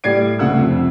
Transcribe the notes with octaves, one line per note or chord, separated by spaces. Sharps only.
A2 G3 D5 G#6 C7 D7
C#2 C3 A3 F#5 E6
F2 C3